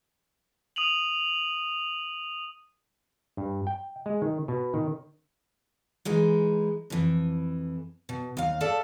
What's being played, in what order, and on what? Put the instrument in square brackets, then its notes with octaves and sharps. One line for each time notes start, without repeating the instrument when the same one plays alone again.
[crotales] D#6 D#7 F7 F#7
[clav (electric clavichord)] G2
G5
G#3
D#3
B2
D#3
[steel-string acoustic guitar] E3 G#3 D#4
F2 E3
B2
D#2 F5
A4 D5 E5 F5 A5